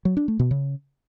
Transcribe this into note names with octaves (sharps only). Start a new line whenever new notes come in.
F#3
D4
A3
B2
C#3